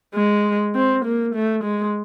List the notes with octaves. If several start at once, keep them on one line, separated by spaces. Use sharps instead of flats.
G#3
C4
A#3
A3
G#3